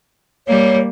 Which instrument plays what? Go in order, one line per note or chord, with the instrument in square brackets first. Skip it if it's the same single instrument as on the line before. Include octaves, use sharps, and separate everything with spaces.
[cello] G3 A#3 [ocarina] C#5